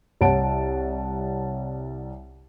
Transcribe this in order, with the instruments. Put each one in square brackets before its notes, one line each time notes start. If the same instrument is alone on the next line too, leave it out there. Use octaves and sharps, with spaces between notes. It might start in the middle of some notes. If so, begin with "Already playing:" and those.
[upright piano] C2 C#5 F#5 A5 D7